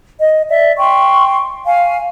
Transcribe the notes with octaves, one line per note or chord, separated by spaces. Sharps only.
D#5
D5 E5
G5 C6 C#6
F5 G#5